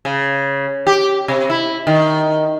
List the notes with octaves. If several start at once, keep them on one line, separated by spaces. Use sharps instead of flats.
C#3
G4
C3
E4
D#3